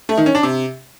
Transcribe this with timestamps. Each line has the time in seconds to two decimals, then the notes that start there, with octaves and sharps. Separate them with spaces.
0.09 A3
0.18 D#3
0.26 C#4
0.35 D4
0.43 C3